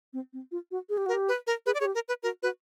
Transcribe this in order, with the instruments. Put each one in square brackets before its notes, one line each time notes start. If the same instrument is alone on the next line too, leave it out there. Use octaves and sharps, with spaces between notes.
[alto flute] C4
C4
F4
F#4
G#4
G4
[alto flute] F#4 [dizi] A#4
[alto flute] G4
[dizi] B4
A#4
[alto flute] G#4 [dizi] B4
[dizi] D5
[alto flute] G#4 [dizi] C#5
[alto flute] G4
[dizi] A#4
B4
[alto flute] F#4 [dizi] A#4
[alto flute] F#4 [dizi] B4